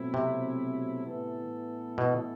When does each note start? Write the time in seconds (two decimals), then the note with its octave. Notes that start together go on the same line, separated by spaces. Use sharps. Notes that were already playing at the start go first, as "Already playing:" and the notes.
Already playing: B2 F#3 A3 C4 E4
0.14 C3
1.06 A2 E3 B3 E4 A4
1.98 B2